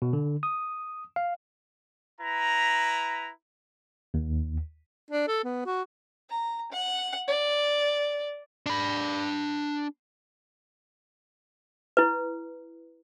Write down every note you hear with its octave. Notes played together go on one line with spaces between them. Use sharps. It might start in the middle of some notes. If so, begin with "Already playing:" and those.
B2
D3
D#6
F5
E4 B4 A#5
D#2
D4
A4
B3
F#4
A#5
F#5
D5
D4 B5
E4 B4